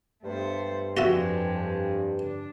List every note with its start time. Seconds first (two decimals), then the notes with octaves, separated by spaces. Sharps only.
0.24 G2 A3 B3 C5
0.97 F2 G3 G#3 F4 F#4 E5
2.21 D4